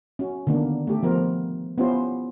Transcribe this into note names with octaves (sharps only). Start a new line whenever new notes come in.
C#4 F#4
D3 D#3 A#3 B3 D4
A3 G4 A4
F3 B3 A#4 C5
B3 C#4 E4 F4 G4 C5